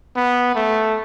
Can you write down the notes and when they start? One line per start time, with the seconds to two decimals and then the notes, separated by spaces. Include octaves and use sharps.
0.16 B3
0.55 A3